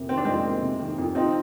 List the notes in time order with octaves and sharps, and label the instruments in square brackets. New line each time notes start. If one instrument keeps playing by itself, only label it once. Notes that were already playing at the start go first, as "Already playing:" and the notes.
Already playing: [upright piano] F2 C3 A#3
[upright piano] D#3 [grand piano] C4
[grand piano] D4
[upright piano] F2 [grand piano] G#3 C4
[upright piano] A#3
C3
D#3
F2
[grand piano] C4 D#4 [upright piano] F4